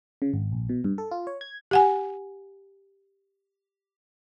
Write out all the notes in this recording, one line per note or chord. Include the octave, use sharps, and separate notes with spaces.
C#3
G#1
A#1
B2
G2
A4
F4
C#5
G#6
G4 F#5 G#5